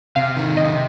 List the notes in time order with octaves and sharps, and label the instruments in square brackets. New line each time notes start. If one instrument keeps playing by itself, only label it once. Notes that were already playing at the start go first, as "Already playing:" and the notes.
[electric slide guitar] C3 [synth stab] F5
[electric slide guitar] D#3
[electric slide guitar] C3 [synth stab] D#5